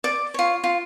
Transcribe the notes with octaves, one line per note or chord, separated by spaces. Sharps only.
D5 D6
F4 C#5
F4